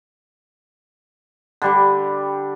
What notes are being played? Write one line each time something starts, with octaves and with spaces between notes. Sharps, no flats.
D3 G3 G4